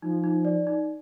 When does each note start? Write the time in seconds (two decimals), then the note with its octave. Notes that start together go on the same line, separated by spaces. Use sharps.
0.02 F3 D#4
0.24 D#4
0.45 D5
0.67 D#4